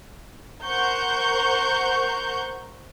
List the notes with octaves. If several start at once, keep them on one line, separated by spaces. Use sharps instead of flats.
A#4 C5 F#5 A#5 C#6 G6